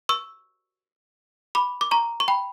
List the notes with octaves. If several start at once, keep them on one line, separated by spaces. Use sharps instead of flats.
C#6 E6
B5 D6
D6
A#5 C#6
C#6
G5 B5